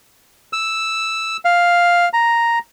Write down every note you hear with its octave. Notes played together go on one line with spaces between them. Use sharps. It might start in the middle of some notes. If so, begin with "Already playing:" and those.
E6
F5
A#5